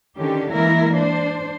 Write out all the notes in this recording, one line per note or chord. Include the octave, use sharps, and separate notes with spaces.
D3 D#3 C#4 G4
E3 G#3 A#3 E4 A#4
D4 C5